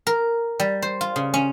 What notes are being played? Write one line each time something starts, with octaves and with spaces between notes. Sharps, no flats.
A#4
G3
C5
F4
C#3
C#4